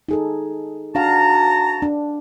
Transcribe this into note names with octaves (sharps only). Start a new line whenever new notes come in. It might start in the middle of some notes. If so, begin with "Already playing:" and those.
D#4 G#4 A4
D4 F#4 F5 F#5 A5 A#5
D4